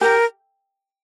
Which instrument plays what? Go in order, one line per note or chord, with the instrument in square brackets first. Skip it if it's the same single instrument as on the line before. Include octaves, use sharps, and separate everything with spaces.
[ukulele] G4 [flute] A#4